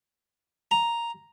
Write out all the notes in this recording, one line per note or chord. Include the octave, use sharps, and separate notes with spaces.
A#5